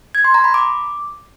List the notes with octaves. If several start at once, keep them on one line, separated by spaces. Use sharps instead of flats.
G#6
C6
A#5
B5
D6